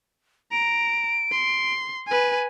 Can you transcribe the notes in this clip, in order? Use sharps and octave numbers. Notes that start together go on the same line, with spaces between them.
A#5 D7
C6
B4 G#5